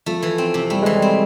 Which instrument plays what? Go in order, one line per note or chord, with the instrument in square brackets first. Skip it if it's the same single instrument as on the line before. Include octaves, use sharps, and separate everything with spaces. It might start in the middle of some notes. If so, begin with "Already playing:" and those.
[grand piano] F3 [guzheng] A3
[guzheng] E3
C4
C3
[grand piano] G3 [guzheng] A3
[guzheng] E3 [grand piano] G#3
[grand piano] G3
[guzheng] C4